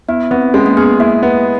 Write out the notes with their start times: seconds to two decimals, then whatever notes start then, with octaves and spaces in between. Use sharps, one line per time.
0.09 B3 E4
0.31 B3 C4
0.54 G#3 C#4
0.66 A#3
0.77 B3 G#4
1.00 A#3 E4
1.23 B3